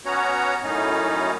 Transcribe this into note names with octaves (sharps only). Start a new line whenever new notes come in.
B3 C#4 F#4 C#5 A#5
F#2 A2 C#4 D#4